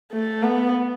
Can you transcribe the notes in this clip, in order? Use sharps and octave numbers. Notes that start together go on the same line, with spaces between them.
A3
B3